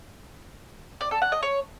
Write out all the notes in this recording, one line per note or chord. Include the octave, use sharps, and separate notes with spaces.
D5
A4
F#5
D#5
C#5